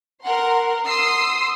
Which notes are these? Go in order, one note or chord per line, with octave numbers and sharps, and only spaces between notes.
A#4 F#5 C6
C6 D#6 E6 C7